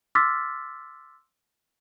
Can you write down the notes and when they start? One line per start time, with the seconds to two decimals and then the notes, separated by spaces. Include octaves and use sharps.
0.15 C6 D6 E6 F6 A6 B6